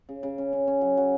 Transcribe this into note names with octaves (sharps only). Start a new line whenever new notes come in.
C#3
C#3
C#4
C#4
C#4
F#3
F#3